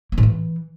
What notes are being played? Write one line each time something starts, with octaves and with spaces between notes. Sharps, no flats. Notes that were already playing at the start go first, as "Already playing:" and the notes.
A#3
A2
E3